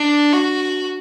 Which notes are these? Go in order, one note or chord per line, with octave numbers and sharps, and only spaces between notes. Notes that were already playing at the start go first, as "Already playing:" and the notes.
Already playing: D4
F#4